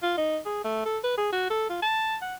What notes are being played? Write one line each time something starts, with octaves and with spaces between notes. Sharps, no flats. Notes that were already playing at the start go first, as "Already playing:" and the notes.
F4
D#4
G#4
A3
A4
B4
G#4
F#4
A4
F4
A5
F#5